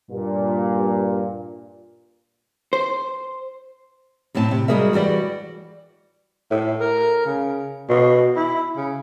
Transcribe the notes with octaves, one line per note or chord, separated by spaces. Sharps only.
G2 A#2
C5
F#2 A2 C4 A5
C3
G3 G#3 F#4 G#4 A#4 E5
E3 G3 F#4 D5
A2
A#4
C#3
B2
E4
C#3